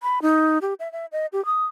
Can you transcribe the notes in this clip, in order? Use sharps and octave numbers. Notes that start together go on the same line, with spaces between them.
B5
D#4
G4
E5
E5
D#5
G4
D#6